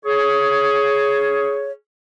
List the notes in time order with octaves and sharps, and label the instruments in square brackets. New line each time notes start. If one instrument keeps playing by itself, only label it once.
[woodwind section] G#4 C#5